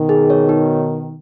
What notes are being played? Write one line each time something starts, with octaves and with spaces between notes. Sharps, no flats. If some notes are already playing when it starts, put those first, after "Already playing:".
Already playing: B2 D#3
G#4
C#5
D#4